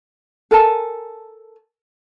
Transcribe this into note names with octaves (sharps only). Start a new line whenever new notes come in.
A4 A#4 G#5 A5